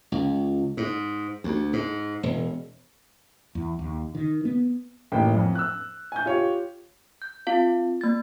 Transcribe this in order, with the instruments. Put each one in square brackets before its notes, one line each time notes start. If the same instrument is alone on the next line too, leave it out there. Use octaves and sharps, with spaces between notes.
[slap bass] C#2
G#2
D2
G#2
E1
[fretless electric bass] E2
D#2
D#3
B3
[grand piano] A1 D#2 A3 G5
F2
E6 F#6
G#5 G6
F4 G4 C#5
[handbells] G6
C4 F4 F5
A#3 A6